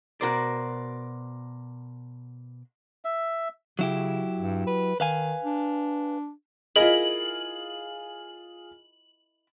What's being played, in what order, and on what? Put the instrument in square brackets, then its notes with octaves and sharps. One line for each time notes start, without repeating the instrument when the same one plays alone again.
[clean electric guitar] B2 D5 [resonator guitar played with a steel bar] F#4 A#4 C5
[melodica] E5
[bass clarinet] C#3 [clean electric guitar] F#3 E4 G4
[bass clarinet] G2
B4
[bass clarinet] D#3 [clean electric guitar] B4 F5 G#5
[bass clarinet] D4
[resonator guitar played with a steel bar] E4 A#4 D#5 [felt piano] F4 G#4 [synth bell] F#7